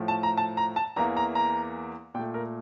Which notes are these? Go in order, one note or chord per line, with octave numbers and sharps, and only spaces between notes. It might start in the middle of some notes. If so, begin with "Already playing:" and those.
Already playing: A2 F3 A3
A5
A#5
A5
A#5
A5
E2 E3 A#3 A#5
A#5
A#5
A#2 A3 G5
A#4